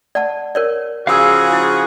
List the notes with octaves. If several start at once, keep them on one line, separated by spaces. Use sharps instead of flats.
D5 F#5 A5
A#4 C#5 D5
C#3 F3 F#4 G#4 F5 E6
E4